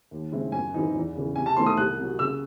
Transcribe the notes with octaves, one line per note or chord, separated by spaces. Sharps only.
D#2
C#3 G#3 C4 E4
F#2 G#5
E3 C4 D#4
E2
C#3 E3
C3 G#5
A5
E3 A3 C4 D#4 C6
D#6
C2 F#6
C3 F#3
C#3 E6